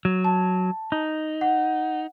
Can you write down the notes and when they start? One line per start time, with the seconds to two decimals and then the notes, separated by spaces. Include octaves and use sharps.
0.05 F#3
0.24 A5
0.92 D#4
1.41 F#5